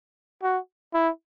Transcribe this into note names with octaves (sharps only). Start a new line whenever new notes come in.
F#4
E4